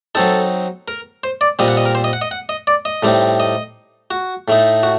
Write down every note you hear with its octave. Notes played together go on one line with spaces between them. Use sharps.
F#3 C4 D#4 A4
A#4
C5
D5
A#2 G3 C4 D#5
F#5
D#5
A#4
C5
D#5
F#5
D#5
F#5
D#5
D5
D#5
A2 G3 C4 D#4
D#5
F#4
A2 A3 D#4
F#4